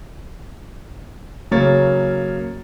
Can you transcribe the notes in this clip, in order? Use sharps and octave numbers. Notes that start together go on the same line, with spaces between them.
C#3 F#3 A#3 C#5 A6